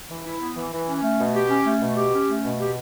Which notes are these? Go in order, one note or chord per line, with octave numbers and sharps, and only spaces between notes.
E3
E4
B3
E3
E3
C#4
A3
B2
G4
C#4
A3
B2
G4
C#4
A3
B2
G4